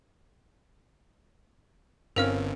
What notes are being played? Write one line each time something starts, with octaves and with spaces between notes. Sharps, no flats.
G1 C4 C#4 A#4 F5 F6